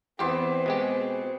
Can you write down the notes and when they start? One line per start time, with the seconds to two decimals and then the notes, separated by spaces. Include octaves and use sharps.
0.19 E2 B3 C4 G4 G#4 C5 D6
0.66 B2 G#3 G4